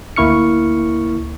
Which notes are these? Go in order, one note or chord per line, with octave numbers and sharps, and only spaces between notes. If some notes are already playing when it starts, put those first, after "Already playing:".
D2 A#3 E4 C#6 F6 C#7